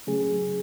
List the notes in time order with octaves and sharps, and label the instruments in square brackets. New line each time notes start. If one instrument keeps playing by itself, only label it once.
[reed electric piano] C#3 F#3 A3 C#4 G#4